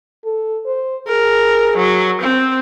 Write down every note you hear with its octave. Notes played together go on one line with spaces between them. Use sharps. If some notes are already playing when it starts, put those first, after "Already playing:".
A4
C5
G#4 A#4
F#3
C4